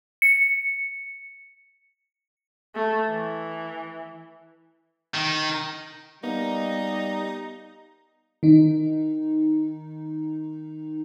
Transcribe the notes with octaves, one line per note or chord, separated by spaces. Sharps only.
C#7
A3
E3
D#3
G3 A#3 B3 D#4
D#3 D#4